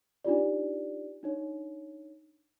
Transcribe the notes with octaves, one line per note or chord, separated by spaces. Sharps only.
D4 D#4 F4 G4 D5
D4 D#4 C#5